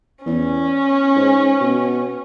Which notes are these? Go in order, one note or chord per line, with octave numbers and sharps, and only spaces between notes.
E2 C#4
G#2
B2